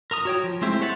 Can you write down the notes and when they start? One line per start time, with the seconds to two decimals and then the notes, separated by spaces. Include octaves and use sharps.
0.11 A#4 A#5 D#6
0.25 F#4 C#5 G5
0.44 F3
0.62 G#3 A3 C4 E4 G4
0.81 C5 C#5 E5 F#5 A5